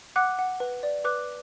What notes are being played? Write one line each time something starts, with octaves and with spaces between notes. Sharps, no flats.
F#5 D6 F#6
F#5
B4
D5
B4 D6 F#6